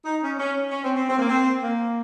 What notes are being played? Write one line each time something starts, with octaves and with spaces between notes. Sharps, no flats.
D#4
C#4
C#4
C#4
C4
C4
C4
A#3
C4
A#3